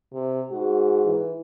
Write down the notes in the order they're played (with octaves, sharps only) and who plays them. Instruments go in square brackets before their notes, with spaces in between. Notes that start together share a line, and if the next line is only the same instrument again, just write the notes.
[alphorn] C3
[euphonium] G#2 [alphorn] F#4
[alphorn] E3